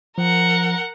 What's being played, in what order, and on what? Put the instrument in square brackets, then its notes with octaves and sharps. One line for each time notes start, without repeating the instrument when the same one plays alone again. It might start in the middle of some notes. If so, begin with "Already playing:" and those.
[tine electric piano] F3 [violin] A#4 F#5